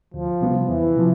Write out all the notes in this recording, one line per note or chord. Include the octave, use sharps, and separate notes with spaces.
D2 F3
C3 G3 B3 F4
E2 E3
C3 F3